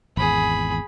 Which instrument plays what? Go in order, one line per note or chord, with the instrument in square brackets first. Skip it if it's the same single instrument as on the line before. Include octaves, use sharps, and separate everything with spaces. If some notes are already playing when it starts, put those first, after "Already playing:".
[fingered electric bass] G#1 E2 [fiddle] G#4 B5